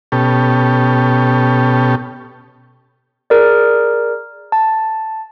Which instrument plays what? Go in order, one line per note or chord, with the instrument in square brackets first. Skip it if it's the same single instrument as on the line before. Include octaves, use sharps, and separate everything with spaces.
[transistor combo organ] B2 C#4 G4 A4
[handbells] G#4 A#4 D5
A5